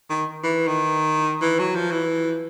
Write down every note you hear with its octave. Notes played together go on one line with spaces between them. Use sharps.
D#3
E3
D#3
E3
F#3
F3
E3